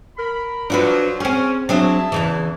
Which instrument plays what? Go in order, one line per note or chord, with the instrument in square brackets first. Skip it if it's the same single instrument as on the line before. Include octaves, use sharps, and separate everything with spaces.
[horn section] A#4 B5
[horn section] F3 F#3 [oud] D4 F#4 B4
[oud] C4 G#4 [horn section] C#4
[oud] F#3 C4 D4 [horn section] G#4 E5 A5
[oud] E2 C#3 E3